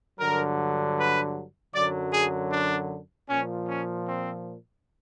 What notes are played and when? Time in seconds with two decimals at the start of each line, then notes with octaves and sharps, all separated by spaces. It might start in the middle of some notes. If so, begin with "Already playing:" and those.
0.20 G2 D3 F#3 A#4
0.97 B4
1.75 F#2 D3 F#3 D5
2.13 G#4
2.52 D4
3.30 A#2 F3 C#4
3.68 C#4
4.07 C4